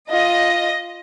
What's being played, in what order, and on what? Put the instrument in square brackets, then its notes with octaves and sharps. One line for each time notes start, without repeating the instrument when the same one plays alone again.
[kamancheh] F4 [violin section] D#5